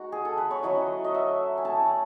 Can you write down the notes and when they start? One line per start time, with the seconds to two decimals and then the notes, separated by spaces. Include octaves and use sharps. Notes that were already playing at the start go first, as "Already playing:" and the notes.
Already playing: G#3 D#4 F#4
0.12 G#4
0.25 A4
0.37 B4
0.51 C#5
0.63 F#3 C#4 E4 D#5
1.04 D#5
1.15 E5
1.58 G#5
1.65 A3 C#4 E4 A5
1.83 F#5